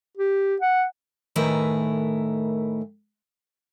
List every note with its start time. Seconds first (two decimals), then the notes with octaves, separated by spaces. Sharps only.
0.17 G4
0.62 F#5
1.36 A2 D#3 A3 A#4 B4 G#5